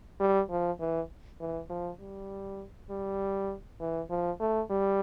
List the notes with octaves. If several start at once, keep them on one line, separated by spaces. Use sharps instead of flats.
G3
F3
E3
E3
F3
G3
G3
E3
F3
A3
G3